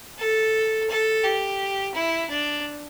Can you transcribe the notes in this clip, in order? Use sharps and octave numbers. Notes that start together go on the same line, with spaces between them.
A4
A4
G4
E4
D4